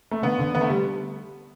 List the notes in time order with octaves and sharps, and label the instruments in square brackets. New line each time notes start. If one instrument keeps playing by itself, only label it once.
[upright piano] A3
D3 B3
D3
D3 B3
A3
G3